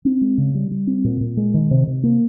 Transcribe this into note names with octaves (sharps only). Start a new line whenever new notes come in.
C4
G#3
C#3
G3
G3
C4
A#2
A#2
G#3
D#3
C3
C3
A#3